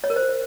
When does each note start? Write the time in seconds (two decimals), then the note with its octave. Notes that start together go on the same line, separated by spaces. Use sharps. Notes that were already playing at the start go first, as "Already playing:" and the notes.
0.04 C#5
0.10 A#4
0.16 C5